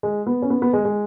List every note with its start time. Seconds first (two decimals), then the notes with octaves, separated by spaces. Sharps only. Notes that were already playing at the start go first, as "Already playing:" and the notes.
0.03 G#3
0.26 B3
0.42 C#4
0.50 B3
0.62 B3
0.73 G#3
0.85 G#3